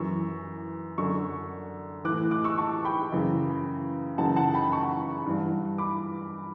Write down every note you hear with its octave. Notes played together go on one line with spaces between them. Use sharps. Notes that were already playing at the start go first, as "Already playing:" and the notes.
Already playing: F#2 E3 C#6 E6
F#2 D3 C#6 E6
A2 E3 D6 F#6
D6 F#6
C#6 E6
A5 C#6
G5 B5
F#2 C#3 E3
F#2 C#3 E3 F#5 A5
F#5 A5
G5 B5
A5 C#6
G2 E3
B5 D6